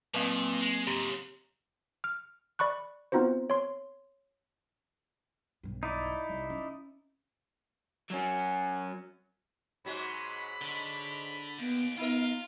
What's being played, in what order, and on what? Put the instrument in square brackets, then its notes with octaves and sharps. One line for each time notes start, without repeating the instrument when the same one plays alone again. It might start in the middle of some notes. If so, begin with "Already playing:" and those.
[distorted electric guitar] A#2 [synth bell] F#3 A#3 C4
[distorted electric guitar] G#3
[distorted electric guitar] G#2 C#3 [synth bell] G4 A#5
[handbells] F6
D5 B5 C#6 F#6
B3 C4 D#4 F4 F#4 C5
C#5 C6
[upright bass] B1 G2
[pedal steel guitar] D#4 E4 D5
[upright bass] C2
C#4
[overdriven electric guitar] F#3 C#4
[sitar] G#2 F#3 G#3 [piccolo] B5
[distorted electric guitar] D3
[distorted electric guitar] D#2 [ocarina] B3 [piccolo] D7
[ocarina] B3 [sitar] D#4 A#4 [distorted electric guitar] F4